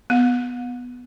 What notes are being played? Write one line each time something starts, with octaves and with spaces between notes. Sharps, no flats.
B3